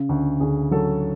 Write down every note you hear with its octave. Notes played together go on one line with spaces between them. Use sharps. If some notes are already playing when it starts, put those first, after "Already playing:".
Already playing: C#3
D2
D2 G#4
F#3 A4